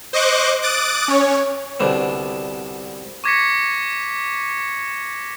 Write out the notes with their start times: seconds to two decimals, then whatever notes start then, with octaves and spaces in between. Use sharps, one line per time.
0.13 C5 D#5 C#6 D6 F#6
0.62 D6 D#6 F#6 A6 D7
1.08 C#4 C#5
1.80 C2 B2 D3
3.24 C#6 D6 G#6 A#6 B6 C#7